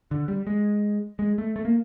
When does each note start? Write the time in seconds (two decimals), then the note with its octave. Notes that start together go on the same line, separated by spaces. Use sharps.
0.11 D3
0.28 G3
0.47 G#3
1.19 G#3
1.38 A3
1.56 A3
1.65 A#3